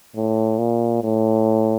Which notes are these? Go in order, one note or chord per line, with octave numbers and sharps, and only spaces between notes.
A2
A#2
A2